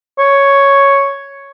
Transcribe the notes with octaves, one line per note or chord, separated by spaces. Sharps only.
C#5